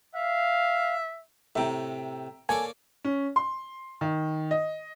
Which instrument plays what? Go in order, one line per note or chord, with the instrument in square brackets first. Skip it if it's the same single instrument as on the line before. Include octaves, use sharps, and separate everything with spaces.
[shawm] E5 [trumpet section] F5
[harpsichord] A2 C3 [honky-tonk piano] E5 G5 A#5
[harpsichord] A#3 C#5 D5 [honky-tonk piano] A4 [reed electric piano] G#5
[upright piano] C#4
C6
D#3
D#5